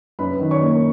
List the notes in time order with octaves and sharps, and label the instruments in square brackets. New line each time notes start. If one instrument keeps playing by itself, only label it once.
[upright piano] F#2 B4 B5
D#3
C#5 C#6
A#3